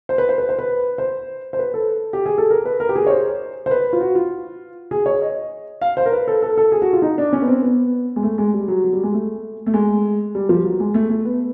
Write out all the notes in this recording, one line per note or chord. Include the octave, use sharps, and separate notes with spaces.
C5
B4
C5
B4
C5
B4
C5
C5
B4
A4
G4
G#4
A4
A#4
B4
A#4
G4
G#4
C#5
C5
C5
B4
F4
F#4
F4
G#4
C#5
D#5
F5
C5
A#4
B4
A4
A4
A4
G#4
F#4
F4
D#4
D4
C#4
B3
C4
B3
G#3
A3
G#3
G3
F#3
F#3
G3
G#3
A3
A3
G#3
G3
F3
F#3
G#3
A3
A3
B3